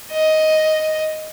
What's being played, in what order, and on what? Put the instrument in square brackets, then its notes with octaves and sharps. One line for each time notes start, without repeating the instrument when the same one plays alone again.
[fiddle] D#5